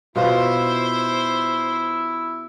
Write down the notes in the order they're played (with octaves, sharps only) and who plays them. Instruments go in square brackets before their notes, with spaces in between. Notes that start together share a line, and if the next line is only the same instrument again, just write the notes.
[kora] B2 F4 B4 [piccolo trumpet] E4 [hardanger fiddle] C5